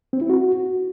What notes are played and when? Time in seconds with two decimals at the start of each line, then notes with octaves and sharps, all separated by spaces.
0.13 C4
0.21 E4
0.30 F#4